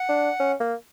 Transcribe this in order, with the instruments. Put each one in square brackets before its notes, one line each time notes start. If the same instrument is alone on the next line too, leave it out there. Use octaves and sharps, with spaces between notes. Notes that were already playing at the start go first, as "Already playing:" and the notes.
Already playing: [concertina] F#5
[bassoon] D4
C#4
A#3